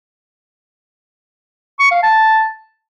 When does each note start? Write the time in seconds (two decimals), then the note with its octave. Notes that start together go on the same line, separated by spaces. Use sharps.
1.79 C#6
1.91 F5
2.03 A5